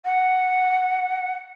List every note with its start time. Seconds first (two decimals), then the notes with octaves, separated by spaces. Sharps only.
0.05 F#5